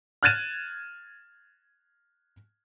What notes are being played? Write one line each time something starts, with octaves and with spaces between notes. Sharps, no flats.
F6 F#6 G#6 A6 D#7 E7